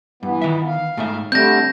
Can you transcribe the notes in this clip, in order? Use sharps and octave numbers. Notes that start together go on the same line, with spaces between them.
G2 E3 B3
D#3 E5
F5
G#2 A3 E5
D3 G3 A3 C4 D4 G6 A#6